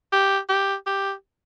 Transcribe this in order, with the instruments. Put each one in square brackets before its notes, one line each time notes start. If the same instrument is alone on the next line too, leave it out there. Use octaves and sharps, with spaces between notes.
[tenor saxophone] G4
G4
G4